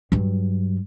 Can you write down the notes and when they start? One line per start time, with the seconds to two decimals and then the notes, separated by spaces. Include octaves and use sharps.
0.12 G2 F#3